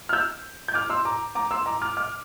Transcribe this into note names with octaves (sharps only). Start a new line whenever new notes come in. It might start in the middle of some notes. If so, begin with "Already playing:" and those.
F6
E6 G6
G6
D6 F6
C6 E6
A#5 D6
A#5 D6
C6 E6
A#5 D6
D6 F6
D6 F6